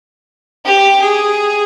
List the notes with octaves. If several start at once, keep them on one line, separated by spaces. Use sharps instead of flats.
G4
G#4